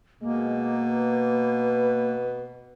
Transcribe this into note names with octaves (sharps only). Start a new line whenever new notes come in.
B2 G#3 A#3
B4